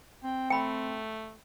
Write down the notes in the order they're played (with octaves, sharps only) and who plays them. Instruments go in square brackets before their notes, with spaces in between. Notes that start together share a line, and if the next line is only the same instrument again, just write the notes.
[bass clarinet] C4 [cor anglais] G5
[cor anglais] A3 [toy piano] G5 B5